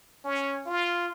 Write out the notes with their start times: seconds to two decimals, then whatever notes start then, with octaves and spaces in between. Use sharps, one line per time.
0.25 C#4
0.66 F4